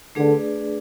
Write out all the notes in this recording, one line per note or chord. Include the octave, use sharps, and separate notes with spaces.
D3 A3 D4 G#4 B4 D5